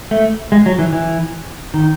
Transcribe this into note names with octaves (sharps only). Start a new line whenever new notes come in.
A3
G#3
F#3
E3
E3
D#3